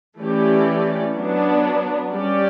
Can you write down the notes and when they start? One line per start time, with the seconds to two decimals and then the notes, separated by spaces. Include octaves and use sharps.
0.17 E3 A3 C#4 G4 D5
1.15 F#3 B3 D4
2.13 G3 C#4 G4 D5